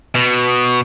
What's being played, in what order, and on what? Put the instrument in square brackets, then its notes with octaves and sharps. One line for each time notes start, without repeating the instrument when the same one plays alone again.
[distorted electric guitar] B2